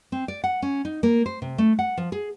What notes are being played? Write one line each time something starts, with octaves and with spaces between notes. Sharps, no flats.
C4
D5
F#5
C#4
D#4
A#3
C5
C3
A3
F#5
F3
G#4